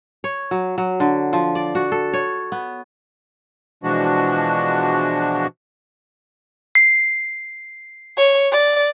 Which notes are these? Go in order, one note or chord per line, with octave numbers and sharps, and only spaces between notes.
C#5
F#3
F#3
D3
F3
D5
F#4
A4
C#5
B3
B2 E3 F3 G#3 D4 F#4
C7
C#5
D5